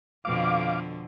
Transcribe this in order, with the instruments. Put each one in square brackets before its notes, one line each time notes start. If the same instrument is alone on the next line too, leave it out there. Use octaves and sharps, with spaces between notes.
[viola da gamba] F2 B2 D3 [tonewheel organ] F5 D6